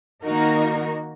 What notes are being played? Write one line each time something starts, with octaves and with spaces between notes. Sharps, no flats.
D#3 A#3 D#4 F#4 A#4